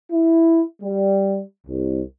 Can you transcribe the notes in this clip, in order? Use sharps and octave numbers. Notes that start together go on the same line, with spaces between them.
E4
G3
C2